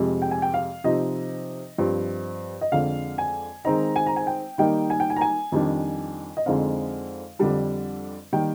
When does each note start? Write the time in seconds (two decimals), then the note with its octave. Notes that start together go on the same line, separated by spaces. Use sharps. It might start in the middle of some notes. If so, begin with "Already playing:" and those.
Already playing: F2 C3 F3 G#3
0.22 G5
0.31 G#5
0.42 G5
0.54 F5
0.84 C3 F3 C4 D#4 D#5
1.78 G2 F3 C4
2.61 D#5
2.72 F2 D3 G#3 F5
3.18 G#5
3.65 D#3 G#3 C4 D#4 A#5
3.96 G#5
4.07 A#5
4.16 G#5
4.27 G5
4.58 D#3 G3 A#3 D#4 G5
4.90 G#5
5.00 G5
5.10 G#5
5.16 A#5
5.21 G#5
5.52 F2 D#3 G3 D4
6.37 D#5
6.46 F2 D3 G#3 C4 D#4 F5
7.39 F2 D3 G3 D4
8.32 D#3 G3 A#3 G5